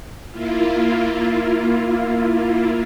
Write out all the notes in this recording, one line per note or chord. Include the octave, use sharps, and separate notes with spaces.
A#3 E4 F4